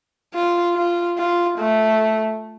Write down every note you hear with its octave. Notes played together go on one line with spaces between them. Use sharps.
F4
F4
F4
A3